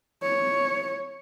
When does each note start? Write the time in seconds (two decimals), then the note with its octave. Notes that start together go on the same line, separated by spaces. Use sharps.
0.23 C#5